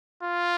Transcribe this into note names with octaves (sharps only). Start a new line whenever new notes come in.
F4